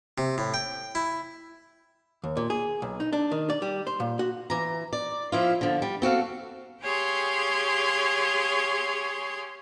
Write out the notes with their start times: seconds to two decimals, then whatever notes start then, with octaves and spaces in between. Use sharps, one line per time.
0.18 C3
0.38 A2
0.54 G5
0.95 E4
2.24 D#2
2.37 A#2
2.50 G#4
2.82 B1
3.00 D#4
3.13 D4
3.31 D#3
3.50 D5
3.62 G3
3.87 C5
4.00 A#2
4.19 F#4
4.50 E3 A#5
4.93 D5
5.32 F3 E4 F4
5.61 D3 F3
5.82 G3
6.02 C4 F#4 A4 F5
6.82 G4 G#4 C#5 F5 C6